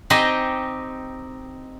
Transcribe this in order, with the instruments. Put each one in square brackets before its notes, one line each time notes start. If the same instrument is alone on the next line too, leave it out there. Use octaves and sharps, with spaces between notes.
[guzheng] C4 D#4 G4 D#5 G#5 C6